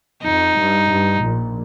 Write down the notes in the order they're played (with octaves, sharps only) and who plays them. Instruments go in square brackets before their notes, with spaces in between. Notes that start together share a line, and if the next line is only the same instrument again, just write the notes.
[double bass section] F2 [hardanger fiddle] D#4
[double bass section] G2
G2
A#1 A#2